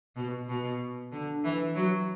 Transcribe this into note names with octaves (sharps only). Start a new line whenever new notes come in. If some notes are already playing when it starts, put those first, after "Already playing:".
B2
B2
D3
E3
F#3